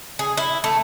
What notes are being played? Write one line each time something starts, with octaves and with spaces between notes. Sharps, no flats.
G#4
E4
A3